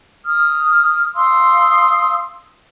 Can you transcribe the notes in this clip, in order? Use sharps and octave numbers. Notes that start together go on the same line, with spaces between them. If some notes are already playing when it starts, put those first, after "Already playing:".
D#6 F6
F5 C6 D#6 E6